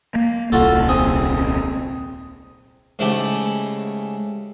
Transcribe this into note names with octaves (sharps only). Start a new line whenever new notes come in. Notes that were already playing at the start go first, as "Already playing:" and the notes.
A#3
D#1 C2 F4 F#4 A4
C4 G#4 G#5
G#2 C#3 A3 E4 G4